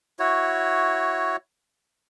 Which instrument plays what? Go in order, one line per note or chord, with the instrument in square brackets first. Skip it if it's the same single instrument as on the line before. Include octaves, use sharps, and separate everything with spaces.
[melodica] E4 F#4 C#5